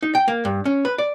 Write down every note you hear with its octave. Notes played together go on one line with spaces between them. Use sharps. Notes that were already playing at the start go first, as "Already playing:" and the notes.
D#4
G5
A#3
G2
C#4
B4
D5